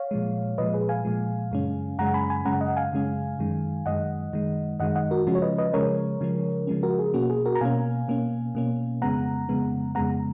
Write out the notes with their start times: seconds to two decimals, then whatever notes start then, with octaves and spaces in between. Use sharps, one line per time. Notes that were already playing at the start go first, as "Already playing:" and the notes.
Already playing: C#5 F5
0.11 A#2 F3 G#3
0.58 A#2 F3 G#3 B4 D#5
0.74 G#4 B4
0.89 F5 G#5
1.05 A#2 F3 G#3
1.52 F#2 C#3 G#3 C#4
1.99 F#2 C#3 G#3 C#4 F#5 A#5
2.14 G#5 B5
2.30 G#5 B5
2.45 F#2 C#3 G#3 C#4 F#5 A#5
2.61 D#5 F#5
2.77 F5 G#5
2.92 F#2 C#3 G#3 C#4
3.39 F#2 D#3 G#3
3.86 F#2 D#3 G#3 D#5 F#5
4.33 F#2 D#3 G#3
4.80 F#2 D#3 G#3 D#5 F#5
4.96 D#5 F#5
5.11 F#4 A#4
5.27 C#3 F3 G#3 C#4 F#4
5.35 C#5
5.42 B4 D#5
5.58 B4 D#5
5.74 C#3 F3 G#3 C#4 A#4 C#5
6.21 C#3 F3 G#3 C#4
6.67 C#3 F3 G#3 C#4
6.83 F#4 A#4
6.99 G#4
7.14 B2 A#3 C#4 F#4
7.30 G#4
7.46 F#4 A#4
7.55 A#5
7.61 B2 A#3 C#4 F5 G#5
8.08 B2 A#3 C#4
8.55 B2 A#3 C#4
9.02 F2 C#3 G#3 B3 F#5 A#5
9.49 F2 C#3 G#3 B3
9.95 F2 C#3 G#3 B3 F#5 A#5